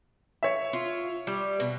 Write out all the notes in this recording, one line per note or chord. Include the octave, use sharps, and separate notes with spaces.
C#5 E5
F4
G3
B2